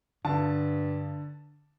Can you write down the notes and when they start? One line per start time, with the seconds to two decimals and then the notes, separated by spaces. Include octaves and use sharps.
0.25 G2 D3 A5